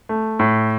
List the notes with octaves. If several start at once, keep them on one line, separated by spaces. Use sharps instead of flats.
A3
A2